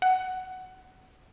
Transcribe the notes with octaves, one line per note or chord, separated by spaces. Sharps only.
F#5